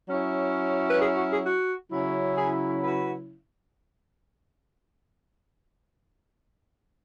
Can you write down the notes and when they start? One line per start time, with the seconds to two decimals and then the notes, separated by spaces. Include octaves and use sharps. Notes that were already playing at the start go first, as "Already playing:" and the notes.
0.09 F#3 C#4 E4
0.90 B4
1.01 G#4
1.16 F#4
1.31 G#4
1.46 F#4
1.92 C#3 F#3 C#4 E4
2.37 G#4
2.83 F#4 B4